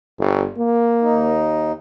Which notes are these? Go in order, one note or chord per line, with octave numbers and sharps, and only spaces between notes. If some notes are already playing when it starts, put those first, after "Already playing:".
G1
A#3
D#2 D#4